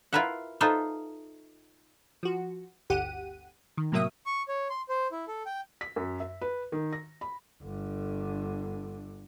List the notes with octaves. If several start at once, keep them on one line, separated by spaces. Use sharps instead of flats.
E4 F4 A#4 B4 E5 F#5
D#4 F4 A4 B4 C5 E5
F3 F#4
G1 D2 G4 F#5 D#7
D#3
A2 C3 F#3 A#3 E5 D#6
C#6
C#5
C6
C5
E4
A4
G5
B6
F#2
E5
B4
D#3
A#6
B5
G1 D3